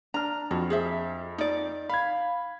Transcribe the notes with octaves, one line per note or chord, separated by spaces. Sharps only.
D4 A#5 F6
F2 F#4
G#4 C5 E5
D#4 D5
F5 B5 G#6